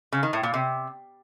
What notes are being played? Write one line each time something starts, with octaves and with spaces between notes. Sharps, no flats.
C#3
D#3
A2
A#2
C3